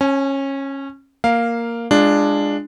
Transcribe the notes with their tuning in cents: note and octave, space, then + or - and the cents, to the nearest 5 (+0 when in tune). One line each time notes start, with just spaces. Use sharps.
C#4 -20 G#5 +30
A#3 +0 A#4 +0 F5 +0
G#3 -15 D4 +5 F4 -25